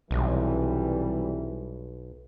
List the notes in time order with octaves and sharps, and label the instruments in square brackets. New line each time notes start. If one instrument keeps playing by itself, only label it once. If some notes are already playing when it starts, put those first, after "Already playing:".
[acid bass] B1 [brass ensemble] C3 E3 G3